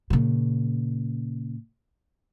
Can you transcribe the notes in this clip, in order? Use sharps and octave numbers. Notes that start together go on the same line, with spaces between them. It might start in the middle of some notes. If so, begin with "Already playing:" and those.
A#2 C#3